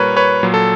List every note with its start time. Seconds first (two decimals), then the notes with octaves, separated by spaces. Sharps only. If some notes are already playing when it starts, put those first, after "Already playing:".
Already playing: A#2 G3 A#4 B4 C#5
0.16 B4 C#5
0.43 A#2 F#3
0.54 A4